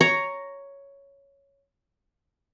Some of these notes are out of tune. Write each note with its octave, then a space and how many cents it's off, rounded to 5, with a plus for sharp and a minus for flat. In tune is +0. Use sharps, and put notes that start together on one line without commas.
C#5 +5 A#5 +0